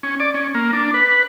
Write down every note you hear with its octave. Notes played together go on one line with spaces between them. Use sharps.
C#4
D5
C#4
A#3
D4
B4